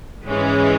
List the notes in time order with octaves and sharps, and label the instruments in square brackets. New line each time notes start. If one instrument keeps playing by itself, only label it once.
[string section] G#2 E3 G#3 C#4